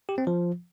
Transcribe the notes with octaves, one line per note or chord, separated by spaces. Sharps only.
G4
C4
F3